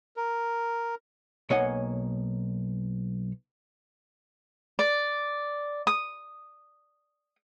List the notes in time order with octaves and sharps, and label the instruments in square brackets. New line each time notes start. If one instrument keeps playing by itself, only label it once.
[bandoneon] A#4
[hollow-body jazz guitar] B1 A#3 C#5 D#5 F#5 G#5
[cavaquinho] D5
D#6